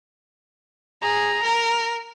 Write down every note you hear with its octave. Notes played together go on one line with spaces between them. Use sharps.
G#4 A#5
A#4